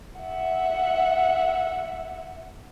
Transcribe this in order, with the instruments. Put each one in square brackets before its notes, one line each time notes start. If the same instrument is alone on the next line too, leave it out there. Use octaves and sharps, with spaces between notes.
[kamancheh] E5 F#5